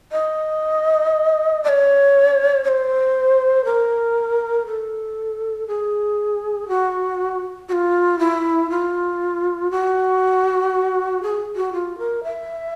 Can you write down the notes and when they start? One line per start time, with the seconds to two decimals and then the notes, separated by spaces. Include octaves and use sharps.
0.12 D#5
1.64 D5
1.69 C#5
2.64 C#5
2.68 C5
3.65 A#4
4.67 A4
5.67 G#4
6.68 F#4
7.69 F#4
7.73 F4
8.19 E4
8.70 F4
9.71 F#4
11.23 G#4
11.56 F#4
11.73 F4
11.98 A#4
12.24 E5